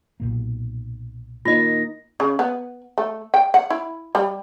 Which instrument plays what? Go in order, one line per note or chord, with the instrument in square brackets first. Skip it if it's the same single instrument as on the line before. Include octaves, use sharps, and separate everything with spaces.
[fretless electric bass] B1 A#2 A#3
[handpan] A#3 D#4 [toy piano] F4 D#5 [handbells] A#6
[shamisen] C#3
B3
A3
G5
F#5
E4
G3